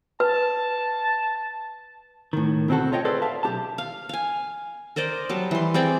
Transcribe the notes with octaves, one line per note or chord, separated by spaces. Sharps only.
B4 A5
A2 D#3
D2 B2 C4 D4 F#4 A4
F4 C#5 D#5 E5 G5
G#4 A4 B4 C5 D5
E5 F5 A5
B1 G4 A5
F5
F5 G#5
A#4 C5 D5 D#5
F#3 G3 A5
E3 C6
C4 G#4 D5 G5